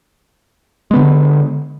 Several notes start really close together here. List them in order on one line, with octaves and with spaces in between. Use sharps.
G#3 B3 D3